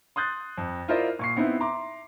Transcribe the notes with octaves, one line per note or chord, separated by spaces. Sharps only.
C6 D#6 F#6 G6 A6
F2
E4 F4 A#4 C5 D5 D#5
A#2 C#6 C7
B3 C4 D#4 E4 B4
E5 A#5 C6 D6